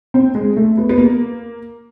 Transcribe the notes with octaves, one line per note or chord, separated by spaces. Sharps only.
C4
G#3
A3
B3
B3
A#3